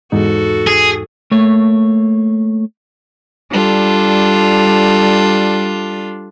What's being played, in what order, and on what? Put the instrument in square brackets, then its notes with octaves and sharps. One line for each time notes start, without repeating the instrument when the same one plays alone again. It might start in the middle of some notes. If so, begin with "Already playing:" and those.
[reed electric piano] E2 G#2 D#4 [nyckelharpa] F#4 A4
[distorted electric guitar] G#4
[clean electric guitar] A3 A#3 C#5
[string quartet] G3 D4 F4 A4